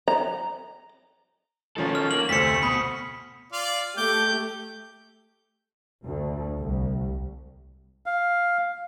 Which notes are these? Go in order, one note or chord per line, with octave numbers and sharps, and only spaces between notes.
A#5
B2 D#3 F3 C#4 A4
F6
A#3 F#7
F1 D2 A3 C5 B6 C#7
B2 B5 D#6 C#7
F4 D5 F5
A3 G4 D6 G6
D2
C2
F5